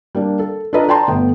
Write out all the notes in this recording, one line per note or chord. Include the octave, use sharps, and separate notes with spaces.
G3 A#3 D4
A4
D4 F4 A4 B4 D#5 A#5
D5 G5 A5 A#5 C6
G1 A3 B3 G5